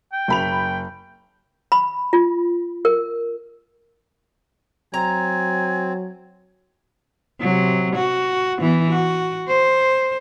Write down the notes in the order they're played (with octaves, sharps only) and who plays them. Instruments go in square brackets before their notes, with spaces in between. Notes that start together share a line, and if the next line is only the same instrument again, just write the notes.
[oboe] G5
[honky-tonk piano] F#1 B5 F7
[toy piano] B5
F4
A#4
[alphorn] F#3 [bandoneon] C4 [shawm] G#5 [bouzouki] A#5
[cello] C3 F#3
F#4
E3 B3
F#4
C5